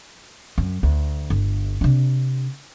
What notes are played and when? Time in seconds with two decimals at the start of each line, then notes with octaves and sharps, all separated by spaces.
0.58 F#2
0.83 D2
1.30 G1
1.81 C3 D4